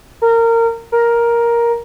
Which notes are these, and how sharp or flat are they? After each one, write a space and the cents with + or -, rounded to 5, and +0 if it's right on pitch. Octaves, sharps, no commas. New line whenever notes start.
A#4 -20
A#4 +10